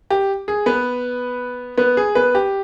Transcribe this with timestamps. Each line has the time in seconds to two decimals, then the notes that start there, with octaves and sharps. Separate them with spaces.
0.11 G4
0.48 G#4
0.66 B3 B4
1.78 B3 B4
1.97 G#4
2.15 B3 B4
2.35 G4